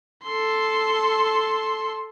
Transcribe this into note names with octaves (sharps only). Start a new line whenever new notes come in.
A4 C6